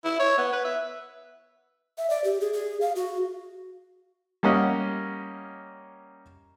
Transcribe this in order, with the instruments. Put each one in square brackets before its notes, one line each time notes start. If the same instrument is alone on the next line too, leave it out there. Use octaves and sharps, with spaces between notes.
[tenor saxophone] E4
C#5
B3
B4
E5
[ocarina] E5
D5
G4
G#4
G#4
F5
F#4
[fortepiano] G3 A#3 C#4 D#5 F#5